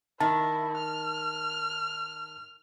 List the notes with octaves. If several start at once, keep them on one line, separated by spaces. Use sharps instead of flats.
D#3 E4 A5
F6